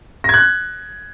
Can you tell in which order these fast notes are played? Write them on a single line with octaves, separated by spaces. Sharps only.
A#6 G#6 F#6